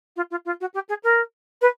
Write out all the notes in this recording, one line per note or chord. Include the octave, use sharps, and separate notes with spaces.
F4
F4
F4
F#4
G4
G#4
A#4
B4